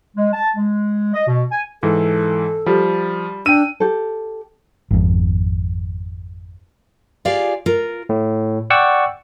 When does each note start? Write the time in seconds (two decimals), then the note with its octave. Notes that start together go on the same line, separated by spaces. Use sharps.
0.17 G#3
0.34 A5
0.56 G#3
1.14 D#5
1.28 B2
1.51 G#5
1.83 G#2 E3 A4
2.66 F3 G3
3.46 D4 G5 E6 D#7
3.80 G4 A4
4.91 G#1 F2
7.25 F4 G4 G#4 D5 F5
7.66 F4 A#4
8.09 A2
8.70 D5 F#5 G5 C#6 E6